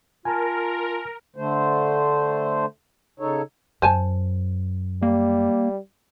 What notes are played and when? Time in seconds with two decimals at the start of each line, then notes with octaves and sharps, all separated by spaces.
0.25 F4 A#4 G#5 A5
1.36 D3 A3 C5
3.20 C#3 D#4 A4 C#5
3.82 F#2 C5 G#5 A5
5.02 G3 A#3